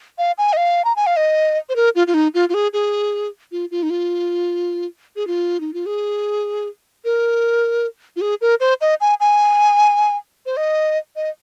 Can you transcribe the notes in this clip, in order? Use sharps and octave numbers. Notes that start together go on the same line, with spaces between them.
F5
G#5
D#5
F5
A#5
G#5
F5
D#5
C5
A#4
F4
F4
D#4
F4
F4
G#4
G#4
F4
F4
D#4
F4
G#4
F4
D#4
F4
G#4
A#4
F4
G#4
A#4
C5
D#5
G#5
G#5
C5
D#5
D#5